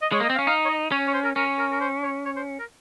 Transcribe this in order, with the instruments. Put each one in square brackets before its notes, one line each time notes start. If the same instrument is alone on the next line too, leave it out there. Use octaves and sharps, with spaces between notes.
[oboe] D#5
[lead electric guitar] G#3 [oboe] C#5
[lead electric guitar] A#3 [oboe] D#5
[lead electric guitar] C4
[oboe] F5
[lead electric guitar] C#4
[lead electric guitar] D#4 [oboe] F5
[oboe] C#5
D#5
[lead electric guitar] C#4 [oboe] C#5
[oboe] C#5
C5
A#4
[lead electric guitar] C#4 [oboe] A#4
[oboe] A#4
A#4
C5
C#5
C#5
C5
A#4